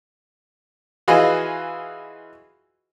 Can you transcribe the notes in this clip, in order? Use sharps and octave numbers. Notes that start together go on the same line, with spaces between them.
E3 F4 F#4 G#4 B4 D#5